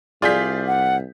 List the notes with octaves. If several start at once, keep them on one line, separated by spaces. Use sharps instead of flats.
C2 F4 G#4 D5 G6 B6
F#5